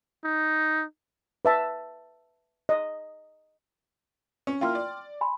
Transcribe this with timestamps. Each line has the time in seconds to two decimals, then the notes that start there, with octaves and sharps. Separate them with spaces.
0.24 D#4
1.45 B4 E5 A5
2.69 D#5
4.47 C#4
4.61 A#3 E4 F4 G5 C6 F6
4.75 D5
5.21 G#5 B5 C6